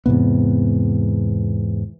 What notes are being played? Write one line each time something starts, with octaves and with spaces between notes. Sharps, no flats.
E2 G#2 C3 B3